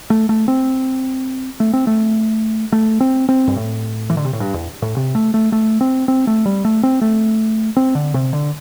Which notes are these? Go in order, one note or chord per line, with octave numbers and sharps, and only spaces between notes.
A3
A3
C4
A3
C4
A3
A3
C4
C4
G2
A2
E3
D3
C3
A2
G2
E2
A2
C3
A3
A3
A3
C4
C4
A3
G3
A3
C4
A3
C4
D3
C3
D3